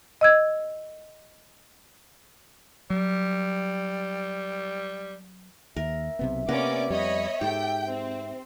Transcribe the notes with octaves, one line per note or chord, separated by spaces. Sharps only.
D#5 E6 G#6
F#3 G3
D#2 A#4 E5
B1 C3 B3
C3 A#3 B3 C#4 A#4 D5 D6
F2 G3 C#5 D#5 B5
G#2 G4 A4 G5
C4